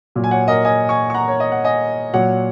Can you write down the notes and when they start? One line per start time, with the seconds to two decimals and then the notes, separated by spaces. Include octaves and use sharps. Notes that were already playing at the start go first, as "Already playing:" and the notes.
0.15 A#2 F#3
0.24 G#5
0.31 C#5 F#5
0.48 A#4 D#5
0.65 D#5 G#5
0.89 G#5 C#6
1.10 C#6
1.14 F#5 A#5
1.28 C#5
1.40 D#5
1.52 F#5
1.64 D#5 G#5
2.13 A#2 F#3 C#5 F#5